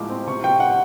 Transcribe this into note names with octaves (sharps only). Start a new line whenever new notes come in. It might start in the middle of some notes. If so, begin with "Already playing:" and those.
Already playing: C2 A2 F3 G#3 D6
C4
C3 C#6
F3 G5
F#5